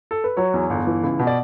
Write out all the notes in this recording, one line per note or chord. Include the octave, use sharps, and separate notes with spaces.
A4
B4
F#3 C#5
E2
G1
E3
C#2
B2
D5